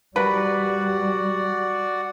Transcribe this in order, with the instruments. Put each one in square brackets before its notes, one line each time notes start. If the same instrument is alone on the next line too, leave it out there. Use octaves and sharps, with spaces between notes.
[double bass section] G3 [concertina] F#4 D5 F#5 [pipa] A#4 B4